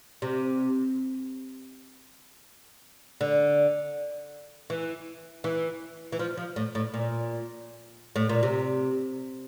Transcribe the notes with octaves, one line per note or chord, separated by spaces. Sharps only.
C3
D3
E3
E3
E3
F3
F3
A2
A2
A#2
A2
A#2
C3